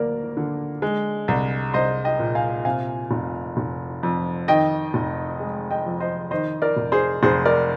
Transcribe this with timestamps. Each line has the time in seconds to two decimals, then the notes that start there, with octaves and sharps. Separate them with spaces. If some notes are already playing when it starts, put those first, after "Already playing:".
Already playing: D2 A#3 A#4 D5
0.37 D3
0.82 G#3
1.28 C2
1.74 C2 C5 D#5
2.04 D#5 G5
2.19 A#2
2.35 F5 G#5
2.65 C3 F5 G#5
3.11 F1
3.57 F1
4.03 F2
4.48 D#3 D#5 G5
4.94 F1
5.40 G#3
5.70 D#5 G5
5.86 F2
6.00 C5 D#5
6.31 D#3 C5 D#5
6.62 A#4 D5
6.77 F1
6.92 G#4 C5
7.23 F1 G#4 C5
7.45 A#4 D5